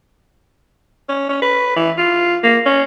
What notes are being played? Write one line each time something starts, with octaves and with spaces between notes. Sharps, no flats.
C#4
C#4
B4
E3
F4
A#3
C#4